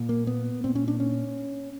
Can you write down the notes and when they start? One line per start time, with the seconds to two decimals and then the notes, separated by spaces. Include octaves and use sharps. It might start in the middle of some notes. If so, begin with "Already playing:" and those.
Already playing: A#2
0.09 A#3
0.27 B3
0.64 A#2 C4
0.75 C#4
0.88 D4
1.00 C#4